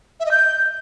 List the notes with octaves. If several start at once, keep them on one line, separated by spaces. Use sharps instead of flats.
E5
D#5
G6